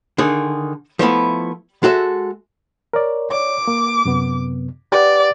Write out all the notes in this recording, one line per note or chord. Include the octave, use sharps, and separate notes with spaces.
D3 D#3 G#4
F3 A3 B3 E4
G#3 F#4 A4 E5
A#4 C#5 D5
C#5 D5 D6
A#3
F#2 C3 B3
G4 B4 D5 F#5